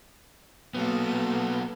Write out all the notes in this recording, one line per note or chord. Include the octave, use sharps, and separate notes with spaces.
F#3 A#3 B3 A4